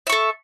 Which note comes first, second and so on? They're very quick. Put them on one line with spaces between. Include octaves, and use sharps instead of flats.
E5 C#6 A4